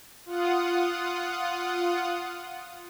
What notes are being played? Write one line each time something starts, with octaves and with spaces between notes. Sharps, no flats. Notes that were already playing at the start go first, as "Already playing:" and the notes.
F4 F#5 D#6